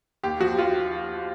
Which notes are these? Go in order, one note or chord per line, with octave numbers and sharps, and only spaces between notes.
D#2 G4
F3 F#4
F4